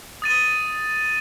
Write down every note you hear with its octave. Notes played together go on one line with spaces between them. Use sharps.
D#6 A6 D#7